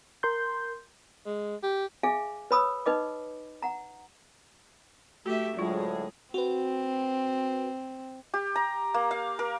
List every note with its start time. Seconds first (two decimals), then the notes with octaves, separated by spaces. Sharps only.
0.23 A#4 C6 G6
1.26 G#3
1.63 G4
2.03 G#4 E5 F5 G#5 D6
2.51 B4 C#5 B5 D#6 E6
2.86 D#4 B4 D#5 D6
3.62 F#5 A#5
5.26 A3 F#4 G4 E5
5.57 D2 A2 F#3 G#3 F4 G#4
6.34 C4 F#4 B4
8.34 G4
8.56 A#5
8.94 A#3
9.11 F5
9.39 A#4